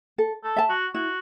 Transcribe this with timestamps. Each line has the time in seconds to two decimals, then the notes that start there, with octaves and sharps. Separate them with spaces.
0.18 A4
0.44 A4
0.56 E5 A5
0.69 F#4
0.94 E4 F#4